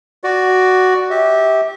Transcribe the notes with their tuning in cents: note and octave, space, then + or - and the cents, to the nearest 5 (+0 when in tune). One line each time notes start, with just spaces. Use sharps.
F#4 +5 D5 +0
G4 +0 E5 -30